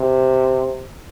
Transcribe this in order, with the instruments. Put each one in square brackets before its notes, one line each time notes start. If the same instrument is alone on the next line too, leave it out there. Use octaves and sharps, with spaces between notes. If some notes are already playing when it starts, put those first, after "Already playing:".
Already playing: [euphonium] C3